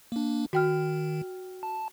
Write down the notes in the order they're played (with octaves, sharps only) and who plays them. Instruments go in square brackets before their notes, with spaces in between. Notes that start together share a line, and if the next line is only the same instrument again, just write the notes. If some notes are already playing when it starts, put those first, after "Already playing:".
[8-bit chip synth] A#3 D4
[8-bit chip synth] D#3 [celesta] F#4 G5 F6
[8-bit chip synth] A5